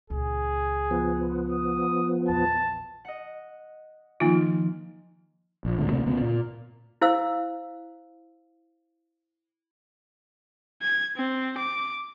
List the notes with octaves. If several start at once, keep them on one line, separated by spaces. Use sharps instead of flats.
C#2 A#2 G#4
F3 B3
D#6
A#1 E2 A5
D#5 F#5
D#3 F3 A#3 D#4 F4
A#1
C#2 A2 D3
D2 C3 A3 A#3
D2 C#3 A#3 B3
A#2
E4 C5 F5 E6
G#6
C4
D6